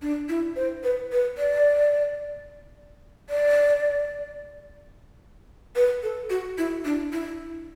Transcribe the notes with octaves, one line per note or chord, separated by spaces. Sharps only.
D4
E4
C5
B4
B4
D5
D5
B4
A4
F#4
E4
D4
E4